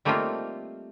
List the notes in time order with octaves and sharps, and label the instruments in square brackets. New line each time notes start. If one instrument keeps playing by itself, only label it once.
[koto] G3 A3 A#3 C4 D#4 F4